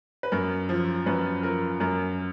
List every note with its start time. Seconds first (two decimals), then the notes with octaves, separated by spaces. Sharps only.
0.23 B4
0.32 F#2 A#4
0.69 F3
1.06 F#2 B4
1.43 F3 A#4
1.80 F#2 A#4